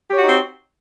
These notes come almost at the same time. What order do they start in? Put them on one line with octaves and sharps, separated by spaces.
G4 C#5 F#4 D#4 C4